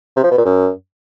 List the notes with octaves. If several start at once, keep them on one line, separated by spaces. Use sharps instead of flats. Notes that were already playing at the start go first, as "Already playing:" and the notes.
C3
F3
B2
A#2
F#2